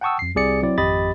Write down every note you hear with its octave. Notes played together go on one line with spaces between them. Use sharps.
F#5 G5 A5 C#6 D#6 E6
F2 C7
C2 C3 G#4 D5 C#7
F#3 C4 E4 D5
G#1 F2 G4 D#5 B5 A6